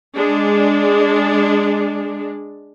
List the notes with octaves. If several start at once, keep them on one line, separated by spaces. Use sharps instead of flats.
G#3 D4